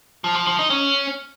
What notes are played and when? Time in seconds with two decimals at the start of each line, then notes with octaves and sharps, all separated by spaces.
0.24 F3
0.36 F3
0.47 F3
0.59 D#4
0.70 C#4